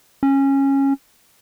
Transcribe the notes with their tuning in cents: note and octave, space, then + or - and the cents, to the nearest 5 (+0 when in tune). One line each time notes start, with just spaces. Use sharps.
C#4 -15